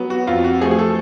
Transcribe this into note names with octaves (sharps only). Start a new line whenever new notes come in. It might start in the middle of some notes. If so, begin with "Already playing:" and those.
Already playing: F#3 B3
F#4
F2 F4
F#4
F3 A3 G#4
G#4
A4